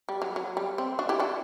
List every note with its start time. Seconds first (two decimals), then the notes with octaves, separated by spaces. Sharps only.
0.09 G3
0.22 F#3
0.36 F#3
0.57 G3
0.78 C4
0.99 D4 F#4
1.09 E4 G4
1.19 D4 F#4